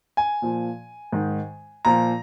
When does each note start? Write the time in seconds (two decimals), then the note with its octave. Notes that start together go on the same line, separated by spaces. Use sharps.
0.17 G#5
0.42 A#2 F3
1.12 G#2 D#3
1.85 A#2 F3 A#5